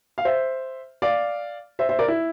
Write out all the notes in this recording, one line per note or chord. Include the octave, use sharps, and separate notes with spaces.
F5
C5 E5
D5 F5
C5 E5
C5 E5
A#4 D5
E4